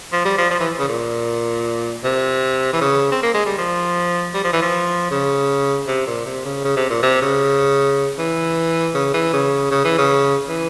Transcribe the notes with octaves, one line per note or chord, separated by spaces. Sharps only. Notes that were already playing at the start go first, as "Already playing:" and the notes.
F3
G3
F3
F3
E3
C#3
A#2
C3
E3
C#3
C4
A#3
G#3
G3
F3
G3
F3
E3
F3
C#3
C3
A#2
C3
C#3
C#3
C3
A#2
C3
C#3
E3
C#3
E3
C#3
C#3
E3
C#3
E3